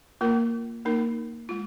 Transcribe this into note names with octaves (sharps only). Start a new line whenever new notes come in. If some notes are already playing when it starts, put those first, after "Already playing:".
A#3 F4 A#4
A#3 D#4 A#4
G#3 F4